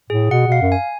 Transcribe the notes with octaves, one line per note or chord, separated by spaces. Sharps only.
A2 G#4
B2 F#5
B2 F5
F#2
G#5